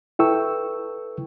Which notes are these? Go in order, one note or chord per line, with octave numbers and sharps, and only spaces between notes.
E4 A4 B4 G5 C#6 E6